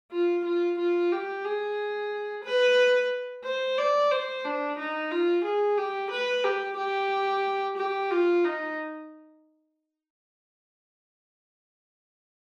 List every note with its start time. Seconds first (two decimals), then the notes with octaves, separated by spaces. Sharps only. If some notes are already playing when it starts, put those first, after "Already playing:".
0.12 F4
0.45 F4
0.79 F4
1.12 G4
1.45 G#4
2.45 B4
3.45 C5
3.78 D5
4.11 C5
4.45 D4
4.78 D#4
5.11 F4
5.45 G#4
5.78 G4
6.11 B4
6.44 G4
6.77 G4
7.77 G4
8.11 F4
8.44 D#4